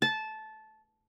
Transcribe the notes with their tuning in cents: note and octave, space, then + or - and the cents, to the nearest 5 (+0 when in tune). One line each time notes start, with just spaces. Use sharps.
A5 -15